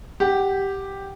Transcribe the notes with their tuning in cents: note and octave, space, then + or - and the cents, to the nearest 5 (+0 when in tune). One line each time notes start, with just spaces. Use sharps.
G4 +0 F#5 +20